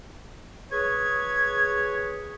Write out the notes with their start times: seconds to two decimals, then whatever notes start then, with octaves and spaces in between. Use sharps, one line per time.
0.71 G#4 B4 C#5 G#6